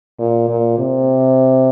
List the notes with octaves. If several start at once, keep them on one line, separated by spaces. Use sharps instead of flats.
A#2
A#2
C3